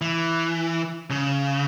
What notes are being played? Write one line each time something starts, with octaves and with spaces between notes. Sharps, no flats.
E3
C#3